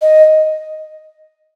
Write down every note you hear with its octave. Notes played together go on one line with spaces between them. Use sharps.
D#5